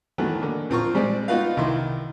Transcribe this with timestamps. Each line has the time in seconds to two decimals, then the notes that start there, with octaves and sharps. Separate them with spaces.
0.18 D#3 E3 F#3 A3 B3
0.42 D3 A#3
0.70 A#1 C4 F4 A#5 C#6
0.95 G3 G#3 C4 C5 D5
1.28 B3 D#4 F4 F#4 B4 F5
1.57 C2 D#3 E4 C6